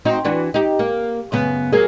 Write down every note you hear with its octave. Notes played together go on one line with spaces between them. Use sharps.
C4 D#4 F#4
E3 D4 F#4
D#4 G4
A#3
F#2 C#3 B3
F#3 A#3 G#4